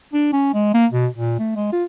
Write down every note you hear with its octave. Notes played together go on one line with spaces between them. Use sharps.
D4
C#4
G#3
A#3
B2
A#2
A3
G#3
F4